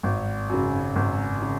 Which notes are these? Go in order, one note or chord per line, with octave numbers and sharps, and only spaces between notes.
G#1
F#2 C#3
G#1
C#3